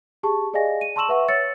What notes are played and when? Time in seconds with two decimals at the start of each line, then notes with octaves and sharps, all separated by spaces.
0.23 G4 G#4 A5 C#6
0.54 G#4 D5 D#5 F5 G#5 A#6
0.81 D#7
0.96 A5 C6 C#6 E6 E7 F#7
1.09 B4 E5 F#5 C#6
1.28 C#5 E6 A6 C#7